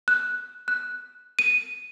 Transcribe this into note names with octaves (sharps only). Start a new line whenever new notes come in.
F#6
F#6
D#7